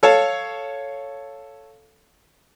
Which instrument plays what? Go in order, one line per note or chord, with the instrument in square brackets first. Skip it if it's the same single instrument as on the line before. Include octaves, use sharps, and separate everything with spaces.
[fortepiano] A4 C#5 F5 A5